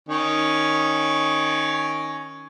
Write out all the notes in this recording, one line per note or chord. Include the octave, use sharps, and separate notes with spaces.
D#3 C#4